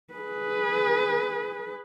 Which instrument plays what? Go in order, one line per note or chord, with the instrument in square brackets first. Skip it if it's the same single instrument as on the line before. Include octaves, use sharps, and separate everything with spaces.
[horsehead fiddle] G#4 B4